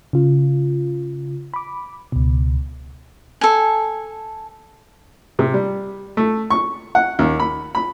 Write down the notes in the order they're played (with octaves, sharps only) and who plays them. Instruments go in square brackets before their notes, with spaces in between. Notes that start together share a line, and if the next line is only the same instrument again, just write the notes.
[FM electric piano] C#3 F4
B5 D6
C#2 B2
[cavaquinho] A4 G#5
[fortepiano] C3
G3
A3
C#6
F#5
D#2
B5
B5